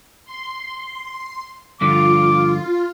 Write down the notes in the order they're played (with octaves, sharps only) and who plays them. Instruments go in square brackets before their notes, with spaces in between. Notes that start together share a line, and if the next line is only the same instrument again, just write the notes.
[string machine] C6
[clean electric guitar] G2 D3 F3 [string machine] F4 [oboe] D6